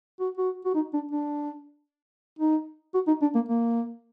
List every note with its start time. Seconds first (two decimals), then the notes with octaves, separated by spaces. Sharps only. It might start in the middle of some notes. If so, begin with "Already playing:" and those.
0.20 F#4
0.37 F#4
0.65 F#4
0.75 D#4
0.93 D4
1.11 D4
2.39 D#4
2.94 F#4
3.07 D#4
3.22 D4
3.35 A#3
3.48 A#3